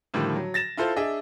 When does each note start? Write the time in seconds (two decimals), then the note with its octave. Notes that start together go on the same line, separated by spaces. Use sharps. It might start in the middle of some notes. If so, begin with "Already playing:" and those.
0.14 A2 D3 D#3 F3 G3
0.36 F#3
0.54 A6 A#6 E7
0.77 E4 F4 A4 C5 F5
0.96 D4 G#4 D#5 E5